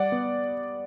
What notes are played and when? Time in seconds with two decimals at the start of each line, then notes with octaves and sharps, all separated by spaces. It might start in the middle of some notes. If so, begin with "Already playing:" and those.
Already playing: G3 D5 F#5
0.12 B3